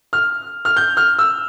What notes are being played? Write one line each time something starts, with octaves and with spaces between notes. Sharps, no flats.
F6
F6
G6
F6
E6